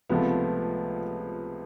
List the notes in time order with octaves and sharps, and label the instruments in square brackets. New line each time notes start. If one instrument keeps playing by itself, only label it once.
[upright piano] C#2 C3 F3 A3 B3